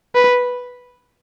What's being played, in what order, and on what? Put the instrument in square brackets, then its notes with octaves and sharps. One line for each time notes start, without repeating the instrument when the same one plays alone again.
[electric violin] B4